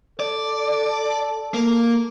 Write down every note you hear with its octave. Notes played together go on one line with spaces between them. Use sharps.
A4 D5
A#3